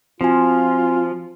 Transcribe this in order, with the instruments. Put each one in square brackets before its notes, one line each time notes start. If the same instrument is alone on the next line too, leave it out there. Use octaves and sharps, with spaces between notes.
[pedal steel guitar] F3 [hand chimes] C4 F#4 G#5 [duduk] F4